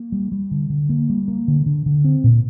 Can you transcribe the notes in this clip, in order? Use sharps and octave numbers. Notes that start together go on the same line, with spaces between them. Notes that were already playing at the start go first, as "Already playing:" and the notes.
Already playing: A#3
G3
G3
D3
D3
A#3
G3
A#3
D3
D3
D3
C4
A#2